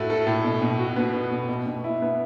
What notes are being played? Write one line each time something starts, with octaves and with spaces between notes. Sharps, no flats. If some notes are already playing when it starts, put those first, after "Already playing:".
Already playing: A2 A3 F#4
A4
A2
B2
B2
F#4
B3
B2
B2
B2
B2
E4
B3